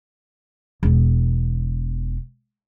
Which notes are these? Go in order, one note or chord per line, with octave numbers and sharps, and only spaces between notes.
E1 B3